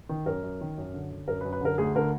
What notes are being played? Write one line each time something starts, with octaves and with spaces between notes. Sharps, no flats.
D#3
F#2 A#4
F#2
D#3
F#2
D3
D3
F#2 A#4
B4
F#2
B4
D3 A#4
D2 G#4
D3 A#4